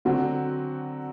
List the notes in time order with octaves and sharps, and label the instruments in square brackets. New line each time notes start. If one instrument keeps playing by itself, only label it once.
[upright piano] D3 F#3 C4 F#4